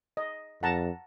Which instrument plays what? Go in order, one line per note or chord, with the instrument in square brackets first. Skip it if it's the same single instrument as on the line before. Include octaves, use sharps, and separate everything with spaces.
[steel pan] D#5
[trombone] F2 [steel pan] F#5 A5 A#5